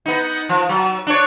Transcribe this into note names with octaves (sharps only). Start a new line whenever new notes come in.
B3 D#4
F3
F#3
D4 C#5